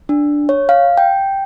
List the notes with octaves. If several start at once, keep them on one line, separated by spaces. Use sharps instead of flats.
D4
C#5
F5
G5